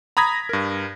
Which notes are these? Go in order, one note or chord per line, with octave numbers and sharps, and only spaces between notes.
A#5 B5 D#6 G#6 A#6 B6
G2 A#4